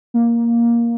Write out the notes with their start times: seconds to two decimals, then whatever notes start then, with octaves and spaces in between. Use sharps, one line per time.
0.14 A#3